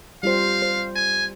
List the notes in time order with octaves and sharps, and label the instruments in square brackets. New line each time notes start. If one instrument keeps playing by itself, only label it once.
[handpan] G3 F4 C5 [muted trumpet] F5
[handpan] C5
[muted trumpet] G#5